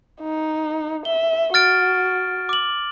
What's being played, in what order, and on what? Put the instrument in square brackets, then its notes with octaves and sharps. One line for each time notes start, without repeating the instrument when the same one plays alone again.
[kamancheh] D#4
[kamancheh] E5 [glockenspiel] G7
[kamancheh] F#4 [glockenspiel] F6 A6 D7
[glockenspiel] D6 F#7